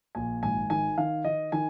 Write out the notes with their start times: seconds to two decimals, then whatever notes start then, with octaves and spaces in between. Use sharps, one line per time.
0.15 A#1 G#5
0.43 G#1 G#5
0.70 D#3 G#5
0.98 D#3 F5
1.24 D#3 D#5
1.52 D#3 G#5